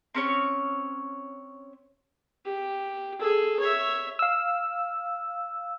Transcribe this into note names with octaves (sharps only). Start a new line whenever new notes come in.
C4 C#4 C#5
G4
G#4 A4
C#5 E5
F5 E6